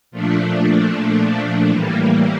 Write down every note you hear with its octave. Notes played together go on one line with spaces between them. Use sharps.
A#2 F3 A3 D4
A2 E3 G3 A#3